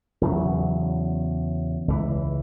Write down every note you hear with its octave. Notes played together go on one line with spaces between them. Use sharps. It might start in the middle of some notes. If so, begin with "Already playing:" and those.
E2 C#3 F#3
C#2 E3